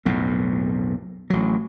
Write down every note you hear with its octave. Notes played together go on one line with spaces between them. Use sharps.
B1 F2 A2
A1 F#3